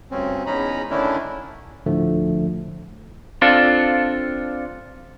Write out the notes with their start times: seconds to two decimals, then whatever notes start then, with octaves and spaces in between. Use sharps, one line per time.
0.11 D2 G2 C4 C#4
0.46 E2 G#3 C#4 D#4 A#5 B5
0.90 D3 D#3 A3 C#4 D4 E4
1.86 D2 A2 D3 F3 A3
3.42 C4 D4 F4 A4